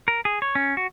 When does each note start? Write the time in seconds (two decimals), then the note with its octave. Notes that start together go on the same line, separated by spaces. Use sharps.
0.08 A#4
0.25 G#4
0.42 C#5
0.55 C#4
0.77 F#4